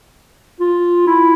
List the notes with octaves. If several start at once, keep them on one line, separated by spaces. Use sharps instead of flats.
F4
E4